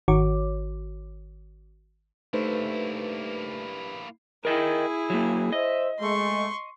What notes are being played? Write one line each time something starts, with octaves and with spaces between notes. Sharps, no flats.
G#1 D#3 F#4 C#5 D6
G2 A3 A#3 D#4 E4 B4 C5
E4 G#4 A#4 D#5 G5
F#3 A#3
C5 D#5 E5
G#3 A3 C6 C#6